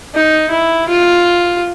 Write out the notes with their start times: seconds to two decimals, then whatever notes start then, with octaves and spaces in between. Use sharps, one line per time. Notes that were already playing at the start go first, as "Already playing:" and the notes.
0.14 D#4
0.50 E4
0.88 F4